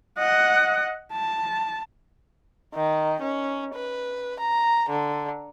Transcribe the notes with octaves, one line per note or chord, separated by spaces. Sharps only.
D#5 F#5
A5
D#3
C#4
B4
A#5
D3